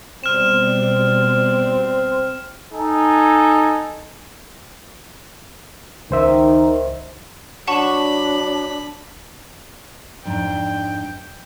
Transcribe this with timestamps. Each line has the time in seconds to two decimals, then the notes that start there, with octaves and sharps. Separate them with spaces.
0.24 B2 G3 C4 D5 F6 E7
2.72 D#4 A4 G#5
6.11 C#2 D#3 C5 E5
7.67 F#3 D4 F#5 A5 B5 C#6
10.25 F2 G#2 D4 G5